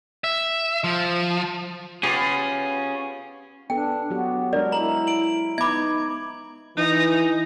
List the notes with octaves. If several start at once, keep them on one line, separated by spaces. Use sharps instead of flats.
E5
F3
B3 C#4 F4 G4 G#4
B3 D4 A4 G5
F#3 B3 F#4 G4
G#3 D4 A#4 D5
E4 A#5 F#7
D7 F#7
B3 D#4 E5 B5 D6 G#6
E3 D#4